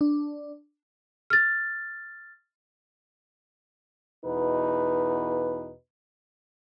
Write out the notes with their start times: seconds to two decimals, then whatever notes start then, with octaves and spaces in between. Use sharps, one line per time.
0.01 D4
1.30 F6 A6
4.25 E2 B2 D#4 B4